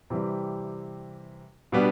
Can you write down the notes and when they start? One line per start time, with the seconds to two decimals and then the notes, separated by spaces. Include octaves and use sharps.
0.10 C3 E3 G3
1.72 B2 G3 B3 D4